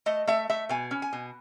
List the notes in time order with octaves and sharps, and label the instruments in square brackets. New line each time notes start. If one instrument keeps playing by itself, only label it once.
[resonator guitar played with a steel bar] A3 D#5
A3 E5
A3 E5
B2 G#5
C#4
G#5
B2